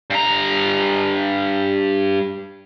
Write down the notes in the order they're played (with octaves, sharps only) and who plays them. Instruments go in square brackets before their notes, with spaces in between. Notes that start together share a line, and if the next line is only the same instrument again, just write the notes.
[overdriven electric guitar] G2 A#5